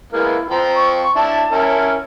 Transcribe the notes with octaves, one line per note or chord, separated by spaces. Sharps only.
G#3 A#3 B3 E4
F3 C4 G5 A#5
C#6
D4 E4 A5
C#4 E4 A#4